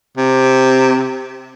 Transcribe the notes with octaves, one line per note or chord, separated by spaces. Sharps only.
C3